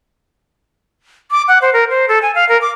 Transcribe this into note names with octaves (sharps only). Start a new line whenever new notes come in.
D6
F#5
C5
A#4
C5
A4
G#5
F5
A#4
D6